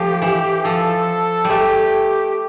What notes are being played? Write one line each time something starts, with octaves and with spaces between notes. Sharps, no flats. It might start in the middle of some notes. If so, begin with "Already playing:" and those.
Already playing: F3 A3 G4
E3
F3 A4
G3
A3 G4